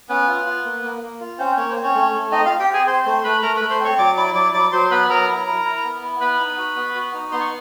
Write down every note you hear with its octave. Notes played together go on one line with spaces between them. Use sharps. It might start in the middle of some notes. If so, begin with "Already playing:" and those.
B3 C#4 B4
F4
F4
A#3
A#3
A#3
F4
C4 C#4 C5
A#3 C#5
C5
C4
C#4 C#5
A3
A3
C4 D#4 D#5
C4 F4 F5
G4 G5
C4
G#4 G#5
C4 C5 C6
A3 C5 C6
A3 B4 B5
A3 A#4 A#5
A3 B4 B5
C5 C6
C4 C#5 C#6
F#3 D5 D6
E4 D5 D6
F#3 D5 D6
F#3 D5 D6
F#3 C5 C6
B3 B4 B5
F#3 A#4 A#5
E4
E4
E4
B3
E4
B3 B4 B5
D#4
F#4
B3
F#4
D#4
B3 C6
C#6